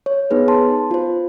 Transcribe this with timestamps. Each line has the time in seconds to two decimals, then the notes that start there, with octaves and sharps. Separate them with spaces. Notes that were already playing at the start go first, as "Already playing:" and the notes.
0.06 C#5
0.31 B3 D#4 G#4 B4
0.48 A5 C6
0.91 F4 C5